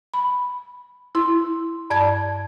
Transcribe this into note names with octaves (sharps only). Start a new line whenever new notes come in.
B5
E4 C6
G2 D5 A5 G#6